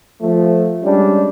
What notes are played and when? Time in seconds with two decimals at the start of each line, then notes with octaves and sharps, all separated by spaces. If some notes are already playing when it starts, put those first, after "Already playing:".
0.22 F3 A3
0.84 G3 G#3 C#4 D4